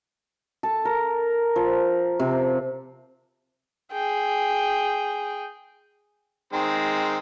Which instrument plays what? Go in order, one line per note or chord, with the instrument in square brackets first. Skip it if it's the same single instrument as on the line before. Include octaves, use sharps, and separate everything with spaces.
[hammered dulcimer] A4
A#4
F3
C3
[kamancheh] G#4 G5
[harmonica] D#3 G#3 C4